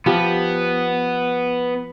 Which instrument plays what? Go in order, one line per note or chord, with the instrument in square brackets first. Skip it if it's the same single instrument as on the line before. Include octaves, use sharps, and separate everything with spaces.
[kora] F3 G4 [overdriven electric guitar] B3